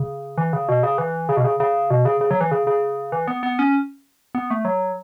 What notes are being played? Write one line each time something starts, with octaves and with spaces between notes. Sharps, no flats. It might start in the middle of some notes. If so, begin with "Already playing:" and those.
Already playing: C#3
E3
C#3
B2
C#3
E3
C#3
B2
C#3
C#3
B2
C#3
C#3
F#3
E3
C#3
C#3
E3
B3
B3
C#4
B3
A3
F#3